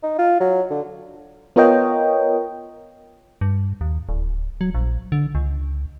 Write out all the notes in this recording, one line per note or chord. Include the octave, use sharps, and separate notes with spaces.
D#4
F4
F#3
D3
B3 F4 A#4 C#5 D#5 G5
G2
D#2
D1
F#3
A#1
D3
C#2